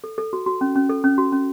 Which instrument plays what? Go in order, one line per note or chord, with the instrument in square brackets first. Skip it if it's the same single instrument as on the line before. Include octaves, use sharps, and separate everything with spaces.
[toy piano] A4
A4
F#4
F#4
C#4
C#4
A4
C#4
F#4
C#4